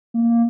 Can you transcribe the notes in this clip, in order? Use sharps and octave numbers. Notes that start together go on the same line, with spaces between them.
A#3